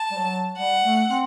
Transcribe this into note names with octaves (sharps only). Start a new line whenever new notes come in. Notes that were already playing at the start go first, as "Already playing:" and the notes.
Already playing: A5
G3
F#3
G3 F#5
A3
C4